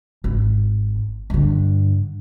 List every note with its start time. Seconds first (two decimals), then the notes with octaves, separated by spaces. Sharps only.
0.24 G#1
1.30 G2 D3